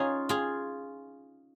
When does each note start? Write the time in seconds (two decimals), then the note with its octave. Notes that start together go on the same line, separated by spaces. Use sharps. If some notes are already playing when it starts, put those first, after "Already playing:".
Already playing: C#4 D#4 F4 G#4
0.29 F4 G#4